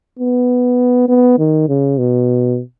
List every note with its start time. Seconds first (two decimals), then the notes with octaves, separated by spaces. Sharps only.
0.20 B3
1.09 B3
1.39 D#3
1.69 C#3
1.98 B2